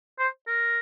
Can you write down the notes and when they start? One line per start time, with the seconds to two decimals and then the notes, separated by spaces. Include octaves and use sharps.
0.19 C5
0.48 A#4